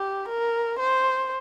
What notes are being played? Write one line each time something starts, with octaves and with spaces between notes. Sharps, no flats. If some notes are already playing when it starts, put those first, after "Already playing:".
Already playing: G4
A#4
C5